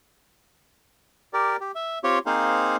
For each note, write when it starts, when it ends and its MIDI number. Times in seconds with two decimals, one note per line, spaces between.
1.33 1.56 67
1.33 1.56 70
1.33 1.56 74
1.61 1.72 67
1.75 1.99 76
2.04 2.19 60
2.04 2.19 65
2.04 2.19 67
2.04 2.19 73
2.26 2.77 58
2.26 2.77 60
2.26 2.77 63
2.26 2.77 68
2.26 2.77 72
2.26 2.77 77